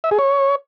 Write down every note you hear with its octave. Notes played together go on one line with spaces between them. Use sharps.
E5
G#4
C#5